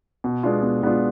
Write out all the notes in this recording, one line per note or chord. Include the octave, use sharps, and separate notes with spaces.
B2
G#3 B3 D4 F4
B2
G#3 B3 D4 F4